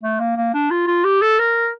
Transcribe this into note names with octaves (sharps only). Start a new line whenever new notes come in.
A3
A#3
A#3
D4
F4
F4
G4
A4
A#4